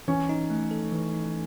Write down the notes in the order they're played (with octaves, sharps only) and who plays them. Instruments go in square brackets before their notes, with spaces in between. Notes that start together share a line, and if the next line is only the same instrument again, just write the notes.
[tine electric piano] E3 [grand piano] C#4
[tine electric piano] D#4
A3
A4
E3
D#4